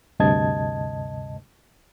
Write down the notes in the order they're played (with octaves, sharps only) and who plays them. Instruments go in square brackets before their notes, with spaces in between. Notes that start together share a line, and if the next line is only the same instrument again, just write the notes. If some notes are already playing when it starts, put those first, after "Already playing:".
[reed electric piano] D2 G2 C3 D#5 A5 G#6